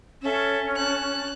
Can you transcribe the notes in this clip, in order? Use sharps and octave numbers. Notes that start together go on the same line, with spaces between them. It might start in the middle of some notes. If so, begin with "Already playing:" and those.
C#4 A4 E5
A5 F#6